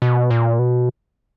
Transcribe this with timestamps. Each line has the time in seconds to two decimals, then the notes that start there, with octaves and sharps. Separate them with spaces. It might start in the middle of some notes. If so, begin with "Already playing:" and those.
0.02 B2
0.30 A#2
0.59 B2